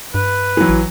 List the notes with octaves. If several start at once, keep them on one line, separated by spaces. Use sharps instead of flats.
G2 B4
E3 F#3
A1